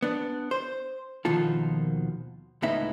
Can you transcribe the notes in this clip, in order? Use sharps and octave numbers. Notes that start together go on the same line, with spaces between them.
B3 D4
C5
D#2 B2 D#3 F3 F4 A4
C#2 A2 B3 D#4 E5